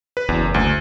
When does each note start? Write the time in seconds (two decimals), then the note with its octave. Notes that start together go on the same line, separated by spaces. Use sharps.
0.17 B4
0.29 F#1 E2
0.54 D2